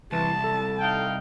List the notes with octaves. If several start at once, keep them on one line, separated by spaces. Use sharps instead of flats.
C2 E3 A5
A4
D#4 F5 G5